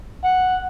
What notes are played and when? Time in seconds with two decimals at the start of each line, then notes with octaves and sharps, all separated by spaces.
0.23 F#5